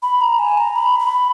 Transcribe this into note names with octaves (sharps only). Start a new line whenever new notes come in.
B5
A#5
G#5
A#5
B5
B5